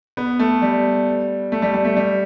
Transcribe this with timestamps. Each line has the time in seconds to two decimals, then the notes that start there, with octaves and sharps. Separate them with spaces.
0.17 B3
0.39 A3
0.62 G3
1.52 A3
1.62 G3
1.74 G3
1.85 A3
1.97 G3